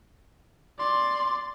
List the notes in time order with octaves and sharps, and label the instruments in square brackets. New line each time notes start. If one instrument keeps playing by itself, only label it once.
[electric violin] D5 C6